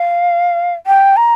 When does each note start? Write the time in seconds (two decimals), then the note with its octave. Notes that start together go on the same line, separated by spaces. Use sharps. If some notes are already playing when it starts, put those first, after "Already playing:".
Already playing: F5
0.86 G5
1.16 A#5